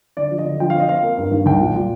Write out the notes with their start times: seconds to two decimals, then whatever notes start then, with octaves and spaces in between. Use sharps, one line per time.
0.17 D3 D5
0.31 F3
0.38 D#5
0.46 D3
0.60 F3 G5
0.70 C4 F5
0.80 D#5
0.88 C4 F5
1.03 A#3
1.17 G2
1.31 D#3
1.46 C2 G5
1.60 A#2
1.75 A#2